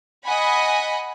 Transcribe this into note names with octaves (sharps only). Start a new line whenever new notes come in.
D#5 F#5 G#5 B5